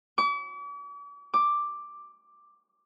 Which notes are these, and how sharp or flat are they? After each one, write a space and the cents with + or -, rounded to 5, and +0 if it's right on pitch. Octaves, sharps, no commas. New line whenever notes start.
D6 -45
D6 +5